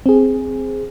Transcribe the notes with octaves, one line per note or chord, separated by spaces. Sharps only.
C4 G#4